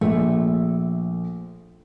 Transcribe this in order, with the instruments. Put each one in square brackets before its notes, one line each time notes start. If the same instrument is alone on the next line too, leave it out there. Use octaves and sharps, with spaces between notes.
[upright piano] A#1 [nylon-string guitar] A3